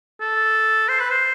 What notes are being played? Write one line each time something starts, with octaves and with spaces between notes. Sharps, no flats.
A4
C5
B4
C5